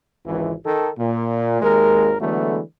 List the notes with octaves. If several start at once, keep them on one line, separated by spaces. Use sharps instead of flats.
G#1 C#2 E3
D#3 A4
A#2
G#1 D#2 G#3 A#4
D3 E3 F#3 G#3 A3 B3